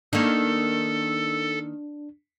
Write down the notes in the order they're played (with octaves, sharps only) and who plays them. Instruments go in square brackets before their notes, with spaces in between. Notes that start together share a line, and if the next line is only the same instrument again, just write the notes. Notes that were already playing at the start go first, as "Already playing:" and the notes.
[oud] D#3 A#3 [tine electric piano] D4 [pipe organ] A4